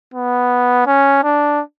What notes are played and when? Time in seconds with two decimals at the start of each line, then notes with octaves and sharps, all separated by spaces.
0.14 B3
0.87 C#4
1.23 D4